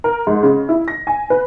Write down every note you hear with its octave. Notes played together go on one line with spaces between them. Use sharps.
A#4
G#2
C#3
E4
A#6
G#5
B4